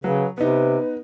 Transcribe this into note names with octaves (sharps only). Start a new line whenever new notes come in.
C#3 F#3 B4
C3 B3 D#4 B4